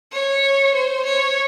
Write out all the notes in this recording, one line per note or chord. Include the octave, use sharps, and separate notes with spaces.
C#5
C5
C#5